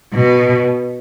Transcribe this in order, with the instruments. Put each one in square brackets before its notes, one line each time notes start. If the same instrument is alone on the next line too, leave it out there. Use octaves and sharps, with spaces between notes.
[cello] B2